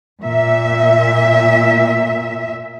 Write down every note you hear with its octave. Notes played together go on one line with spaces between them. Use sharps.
A#2 E5